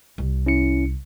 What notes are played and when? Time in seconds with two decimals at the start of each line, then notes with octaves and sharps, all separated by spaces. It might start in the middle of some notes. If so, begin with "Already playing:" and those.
0.18 C2
0.46 C#4 E4 C#7